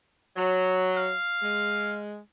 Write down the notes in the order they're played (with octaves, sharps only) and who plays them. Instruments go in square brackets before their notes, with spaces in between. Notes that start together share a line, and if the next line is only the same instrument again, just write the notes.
[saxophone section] F#3
[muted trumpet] F5
[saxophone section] G#3